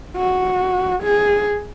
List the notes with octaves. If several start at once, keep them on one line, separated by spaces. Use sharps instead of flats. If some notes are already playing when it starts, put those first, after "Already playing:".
F#4
G#4